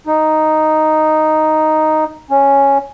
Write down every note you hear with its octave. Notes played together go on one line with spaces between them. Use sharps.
D#4
C#4